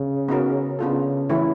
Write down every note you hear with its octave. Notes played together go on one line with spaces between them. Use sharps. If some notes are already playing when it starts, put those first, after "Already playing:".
Already playing: C#3
B3 D#4 F#4 A#4
C#3 B3 D4 F4 A4
E3 A3 C#4 E4